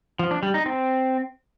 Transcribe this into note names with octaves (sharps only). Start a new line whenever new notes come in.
F3
D4
G3
D#4
C4